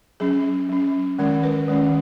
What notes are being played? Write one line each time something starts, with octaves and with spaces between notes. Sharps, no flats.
F#3 C#4 G#4
F#3 C#4
D#3 G#3 C#4 A#4
B4
D#3 G#3 C#4